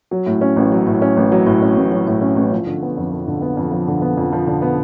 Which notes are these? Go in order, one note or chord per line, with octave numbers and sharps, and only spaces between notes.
F#3
A2
C#4
A1
F#3
A2
C#4
A1
F#3
A2
C#4
A1
F#3
A2
C#4
A1
F3
D3
B3
F2
F3
D3
B3
F2
F3
D3
B3
F2
F3
D3
B3